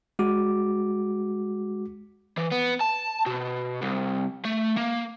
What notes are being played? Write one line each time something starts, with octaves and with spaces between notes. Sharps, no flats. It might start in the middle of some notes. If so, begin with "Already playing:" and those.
G#3 F#4 D6
E3
B3
A5
B2
C2
A3
A#3